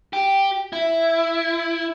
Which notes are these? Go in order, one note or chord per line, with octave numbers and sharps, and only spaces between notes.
G4
E4